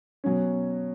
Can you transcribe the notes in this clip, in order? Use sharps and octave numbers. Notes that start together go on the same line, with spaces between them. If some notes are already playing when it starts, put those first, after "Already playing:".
B2 F#3 C#4